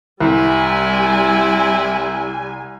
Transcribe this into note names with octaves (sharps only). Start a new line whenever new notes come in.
C2 G3 C4 E4 G#5